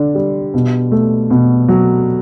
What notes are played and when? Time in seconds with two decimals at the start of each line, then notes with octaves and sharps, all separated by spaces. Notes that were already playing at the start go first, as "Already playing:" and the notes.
Already playing: D3 D4
0.15 G3
0.54 B2
0.92 A3
1.30 B2
1.68 F#3